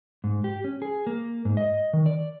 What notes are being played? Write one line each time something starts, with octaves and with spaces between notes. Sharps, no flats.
G#2
G4
C#4
G#4
A#3
G#2
D#5
D#3
D5